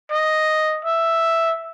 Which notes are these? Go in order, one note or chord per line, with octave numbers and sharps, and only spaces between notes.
D#5
E5